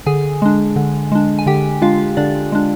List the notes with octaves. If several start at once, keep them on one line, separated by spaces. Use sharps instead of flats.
D3 G#4 G#5
G#3 D4
D3
G#3 D4
G#5
D3 G4 G5
G#3 D4 F4 F5
D3 D4 D5
G#3 D4